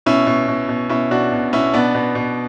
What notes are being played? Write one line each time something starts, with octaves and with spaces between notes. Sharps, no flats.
B2 C#4 E4
B2
B2
B2
B2 C#4 E4
B2 D4 F#4
B2
B2 C#4 E4
B2 B3 D4
B2
B2